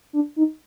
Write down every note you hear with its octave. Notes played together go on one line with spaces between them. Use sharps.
D4
D#4